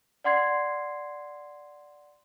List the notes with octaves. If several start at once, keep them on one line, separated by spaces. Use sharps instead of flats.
D5 F#5 C6 G#6 C7